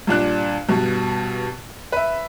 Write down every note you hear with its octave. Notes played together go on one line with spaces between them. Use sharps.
G2 A#2 D4 F#6
G2 B2
B4 E5